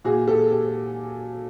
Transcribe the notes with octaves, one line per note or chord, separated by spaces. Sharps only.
A#2 F#4 G#4
G4 A4
G4 A4